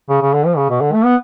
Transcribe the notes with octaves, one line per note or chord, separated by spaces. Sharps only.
C#3
C#3
D3
F3
C#3
B2
D3
A3
B3